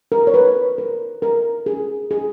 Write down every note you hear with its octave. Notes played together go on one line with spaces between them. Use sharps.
A#4
C#5
B4
A#4
A#4
G#4
G#4